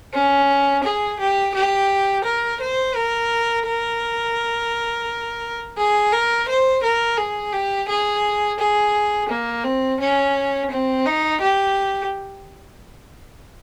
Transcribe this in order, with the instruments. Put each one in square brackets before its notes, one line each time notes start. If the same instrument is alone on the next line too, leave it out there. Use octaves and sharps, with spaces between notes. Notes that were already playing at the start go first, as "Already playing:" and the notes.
[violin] C#4
G#4
G4
G4
A#4
C5
A#4
A#4
G#4
A#4
C5
A#4
G#4
G4
G#4
G#4
A#3
C4
C#4
C4
D#4
G4